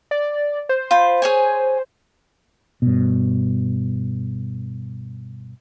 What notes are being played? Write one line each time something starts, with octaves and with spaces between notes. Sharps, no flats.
D5
C5
F4 B5
G#4 C#5 G#5
G2 B2